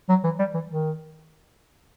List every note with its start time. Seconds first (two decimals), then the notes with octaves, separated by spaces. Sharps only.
0.09 F#3
0.24 E3
0.39 G3
0.54 E3
0.69 D#3